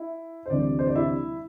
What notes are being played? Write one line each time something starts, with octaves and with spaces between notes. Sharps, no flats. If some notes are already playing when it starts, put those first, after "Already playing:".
Already playing: E4
C5
D2 C3 E3 G3 D5
C5
D5
E4 E5